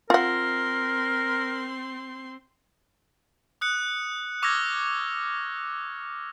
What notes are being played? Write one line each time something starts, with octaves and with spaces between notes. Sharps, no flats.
C4 F4 A#4 F#5 C6
D#6 F#6 C#7
C#6 D6 E6 F6 G#6 A#6